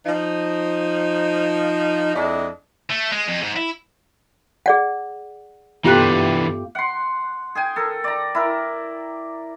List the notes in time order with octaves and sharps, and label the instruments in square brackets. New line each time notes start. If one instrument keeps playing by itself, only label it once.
[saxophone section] F3 D#4
F2 G#3 D4 E4 D#5
[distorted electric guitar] A3
G#3
F2
G#2
E4
[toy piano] G#4 D5 F#5
[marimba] G2 B3 F#6 [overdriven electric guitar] E3 D4 [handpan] A3 F4 G4
[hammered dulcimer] F#5 C6
G#4 G5 G#5
A4 A#4
D5 A#5
E4 A#4